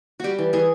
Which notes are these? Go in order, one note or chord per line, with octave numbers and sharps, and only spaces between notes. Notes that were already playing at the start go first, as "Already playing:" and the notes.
G3 F#4 G4
E3
E3 G#4